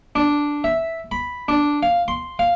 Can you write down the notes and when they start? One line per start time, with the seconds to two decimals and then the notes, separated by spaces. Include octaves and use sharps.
0.15 D4
0.64 E5
1.11 B5
1.48 D4
1.83 F5
2.08 C6
2.39 F5